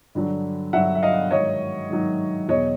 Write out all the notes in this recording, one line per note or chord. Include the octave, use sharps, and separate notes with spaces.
G2 D3 F#3
G2 D3 F#3 E5 F#5
E5
D#5 F5
G#2 D#3 F#3 C#5 D#5
G#2 D#3 F#3
E2 B2 F#3 C#5 D#5